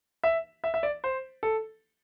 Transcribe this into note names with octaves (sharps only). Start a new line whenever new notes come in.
E5
E5
E5
D5
C5
A4